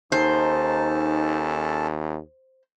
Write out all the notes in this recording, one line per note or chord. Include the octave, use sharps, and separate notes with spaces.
D#2 C#4 D#4 A4 C5 A5